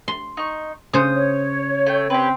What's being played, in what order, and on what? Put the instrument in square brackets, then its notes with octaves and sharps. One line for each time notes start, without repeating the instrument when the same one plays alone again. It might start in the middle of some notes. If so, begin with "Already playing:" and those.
[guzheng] C6
[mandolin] D#4 C#6
[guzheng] C#3 C5 [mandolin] D#6
[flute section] C#5
[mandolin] A3 G5
[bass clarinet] C4 [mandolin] G4 B4